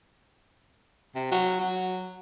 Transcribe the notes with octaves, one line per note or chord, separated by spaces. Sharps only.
C3
F#3
F#3